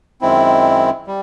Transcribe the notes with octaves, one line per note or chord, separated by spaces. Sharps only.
F#2 D#3 G#3 C4 E4
G3